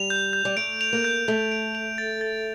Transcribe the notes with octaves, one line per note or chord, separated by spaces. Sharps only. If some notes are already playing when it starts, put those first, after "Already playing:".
Already playing: G3 F7
G6
G6
G3
A3 D7
F7
A#3
G6
A3 G6
D7
F7
A6
A6